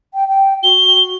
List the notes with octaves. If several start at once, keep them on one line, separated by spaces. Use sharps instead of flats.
G5
G5
F#4 G7